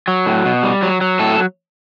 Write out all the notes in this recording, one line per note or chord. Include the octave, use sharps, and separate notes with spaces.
F#3
A2
B2
G3
F#3
F#3
A2 A4